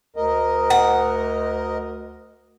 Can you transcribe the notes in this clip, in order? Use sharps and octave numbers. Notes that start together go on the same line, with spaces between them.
D2 A#4 D#5
F#5